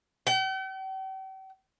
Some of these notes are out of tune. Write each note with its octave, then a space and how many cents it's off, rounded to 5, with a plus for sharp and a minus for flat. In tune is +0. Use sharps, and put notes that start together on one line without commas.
G5 -45